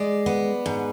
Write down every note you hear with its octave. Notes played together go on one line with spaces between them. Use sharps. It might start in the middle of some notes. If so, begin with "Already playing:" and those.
Already playing: G#3 D5
B3
G#2